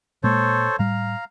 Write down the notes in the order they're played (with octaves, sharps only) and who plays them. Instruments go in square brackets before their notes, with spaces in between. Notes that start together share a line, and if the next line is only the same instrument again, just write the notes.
[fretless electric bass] A#2 G#3 A#3 [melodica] A4 C5 C#5
[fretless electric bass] A2 G3 [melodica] F5 A#5